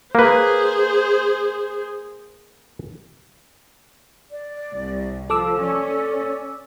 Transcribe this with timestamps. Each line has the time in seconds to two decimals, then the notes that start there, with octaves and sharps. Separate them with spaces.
0.15 A#3 G#4 B4 C5
4.31 D5
4.72 C2
5.30 F3 A4 A5 D6 E6
5.61 C#4 D5